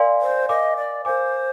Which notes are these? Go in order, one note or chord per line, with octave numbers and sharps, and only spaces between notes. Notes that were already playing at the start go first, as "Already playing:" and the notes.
Already playing: A#4 D5 F5 G#5 C6
C5
A#4 D#5 F5 G#5 D6
D5
A#4 C5 F5 G#5 D6